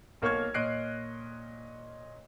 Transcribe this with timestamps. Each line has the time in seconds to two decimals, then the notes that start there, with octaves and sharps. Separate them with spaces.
0.22 B1 A#3 C#5 C#6 F6 G#6
0.54 A#2 C#5 D#5 F#6 C7 D7